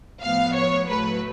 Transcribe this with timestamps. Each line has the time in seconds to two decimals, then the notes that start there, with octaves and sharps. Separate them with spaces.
0.21 A2 F3 B3 F5
0.54 C#5
0.88 A2 F#3 A3 B4